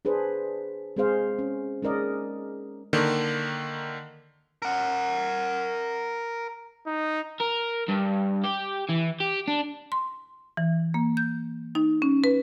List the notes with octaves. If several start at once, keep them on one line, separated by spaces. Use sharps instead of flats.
D4 G#4 B4 C5
G#3 C4 G#4 C5 F5
C#4
G#3 C#4 D#4 A#4 D5 D#5
D3 D#3 A#3
A#4 F#5
D#4
A#4
G2
G4
E3
G4
D4
C6
E3
A#3
G6
D#4
C#4
B4